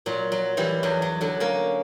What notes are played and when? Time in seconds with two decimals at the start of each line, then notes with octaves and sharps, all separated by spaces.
0.06 A#2 F#3
0.32 F#3
0.57 E3 G3
0.83 E2 F#3
1.02 F#3
1.21 D3 F#3
1.40 A#3 C#4